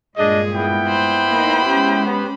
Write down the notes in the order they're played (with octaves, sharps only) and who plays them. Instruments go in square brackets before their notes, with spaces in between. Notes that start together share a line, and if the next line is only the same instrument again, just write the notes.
[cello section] G2 A#2 G#3 [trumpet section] D4 D#5 [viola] G#4
[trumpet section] B3 E4 G5
[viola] C5 B5
[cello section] A#3 D#4
G#3 C#4 G4
[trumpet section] B3